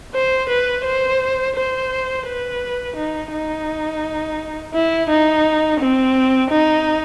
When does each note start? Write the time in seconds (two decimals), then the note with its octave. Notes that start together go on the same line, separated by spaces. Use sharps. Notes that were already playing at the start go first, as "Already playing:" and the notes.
0.14 C5
0.49 B4
0.85 C5
1.56 C5
2.27 B4
2.96 D#4
3.33 D#4
4.74 E4
5.09 D#4
5.80 C4
6.50 D#4